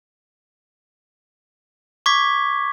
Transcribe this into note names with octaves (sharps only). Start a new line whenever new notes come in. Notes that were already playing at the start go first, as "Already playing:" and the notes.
C#6 D6 G#6 B6